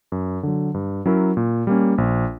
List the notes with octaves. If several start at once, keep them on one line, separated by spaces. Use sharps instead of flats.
F#2
D3 F#3
G2
F#3 C#4 E4 A#4
A#2
G3 A#3 C#4
A#1